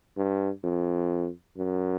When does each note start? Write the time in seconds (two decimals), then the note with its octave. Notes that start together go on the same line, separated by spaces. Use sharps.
0.17 G2
0.64 F2
1.57 F#2